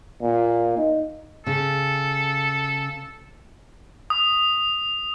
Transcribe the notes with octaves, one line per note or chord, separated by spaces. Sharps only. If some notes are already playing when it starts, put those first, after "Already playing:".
A#2
D#4
C#3 A4
D#6